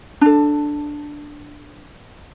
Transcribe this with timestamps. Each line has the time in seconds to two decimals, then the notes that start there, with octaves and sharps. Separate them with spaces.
0.21 D4 A4